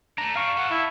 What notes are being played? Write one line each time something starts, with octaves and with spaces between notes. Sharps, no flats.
A3 D4 A#5
G3 D4 F5 C#6
A4 B4 F#5
E4